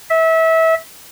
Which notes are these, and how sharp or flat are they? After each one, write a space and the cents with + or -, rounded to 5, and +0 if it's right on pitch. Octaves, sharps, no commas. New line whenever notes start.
E5 -25